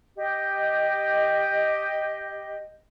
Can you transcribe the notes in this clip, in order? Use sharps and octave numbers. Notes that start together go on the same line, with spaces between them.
G4 D#5